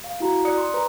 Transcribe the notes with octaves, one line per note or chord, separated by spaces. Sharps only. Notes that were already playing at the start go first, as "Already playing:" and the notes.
F5
E4 F#4 A#5
D5 D#6 F#6 C#7
C6
B4 A#5